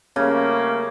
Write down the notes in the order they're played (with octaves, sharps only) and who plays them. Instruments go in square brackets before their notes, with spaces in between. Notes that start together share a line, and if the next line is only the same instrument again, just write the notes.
[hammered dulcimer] C#3 [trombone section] G3 A3 A#3